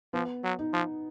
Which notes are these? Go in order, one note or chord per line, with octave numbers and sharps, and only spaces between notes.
F3 B3
F#3
D#4
F3